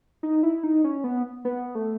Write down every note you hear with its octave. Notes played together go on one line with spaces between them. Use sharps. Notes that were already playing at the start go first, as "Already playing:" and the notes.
D#4
E4
D#4
C#4
B3
B3
A3